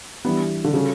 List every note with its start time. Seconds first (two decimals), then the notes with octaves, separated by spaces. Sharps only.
0.25 E3 G3 B3 D4 G4
0.64 D3
0.73 C#3 G3 C#4 F#4 A4